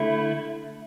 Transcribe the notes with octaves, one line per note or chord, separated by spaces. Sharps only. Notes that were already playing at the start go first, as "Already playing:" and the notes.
Already playing: D3 A3 E4